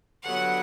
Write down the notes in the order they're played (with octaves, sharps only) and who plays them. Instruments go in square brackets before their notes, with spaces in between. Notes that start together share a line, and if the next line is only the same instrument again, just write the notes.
[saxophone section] G2 D3 F#3 B3 [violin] F#5